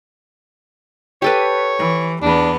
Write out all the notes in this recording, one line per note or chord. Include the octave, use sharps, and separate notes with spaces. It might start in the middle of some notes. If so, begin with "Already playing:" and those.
G4 A4 B4 C#5
E3
E2 B3 D4